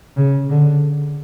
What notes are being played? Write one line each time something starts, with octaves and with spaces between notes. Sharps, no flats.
C#3
D3